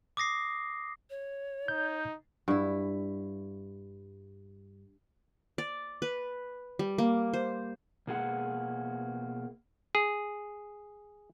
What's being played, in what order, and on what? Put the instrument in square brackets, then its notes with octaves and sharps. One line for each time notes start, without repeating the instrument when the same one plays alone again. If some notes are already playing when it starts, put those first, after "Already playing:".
[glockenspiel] D6 D#6 A#6 C7
[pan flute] C#5
[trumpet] D#4 [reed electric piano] G6
[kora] G2 E4
[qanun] D5
B4
G3
A#3
C5
[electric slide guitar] B2 A#3 G#4 F#5
[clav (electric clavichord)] G#4